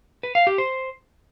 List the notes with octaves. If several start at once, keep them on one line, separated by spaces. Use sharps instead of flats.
B4
F5
G4
C5